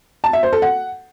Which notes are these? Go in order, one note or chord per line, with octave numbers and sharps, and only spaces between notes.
A5
E5
C5
A4
F#5